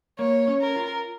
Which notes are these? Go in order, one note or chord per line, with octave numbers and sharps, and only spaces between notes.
A#3 C#5
C#4
A#4
F4